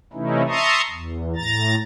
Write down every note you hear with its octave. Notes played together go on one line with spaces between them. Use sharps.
C3 E3 A3 C#4 D#4 E4
E5 A5 A#5 C6 C#6 D#6
E2
A2 A#5 A6